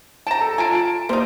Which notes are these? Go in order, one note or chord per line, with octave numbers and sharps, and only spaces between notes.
G5 A5 A#5 E7
A4
F4 G#5 A5 D7
G3 A#3 D#4 C5